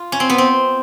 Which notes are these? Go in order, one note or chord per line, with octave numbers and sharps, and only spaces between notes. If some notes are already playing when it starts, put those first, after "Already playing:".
Already playing: F4
C#4
C4
B3
C4